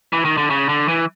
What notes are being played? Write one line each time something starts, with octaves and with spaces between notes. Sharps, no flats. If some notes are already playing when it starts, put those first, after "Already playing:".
E3
D#3
D3
C#3
D3
E3